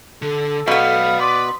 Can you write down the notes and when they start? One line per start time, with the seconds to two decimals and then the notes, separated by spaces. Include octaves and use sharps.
0.22 D3 A4
0.68 B2 B3 D5 F5 B5
1.20 B4 D5 C6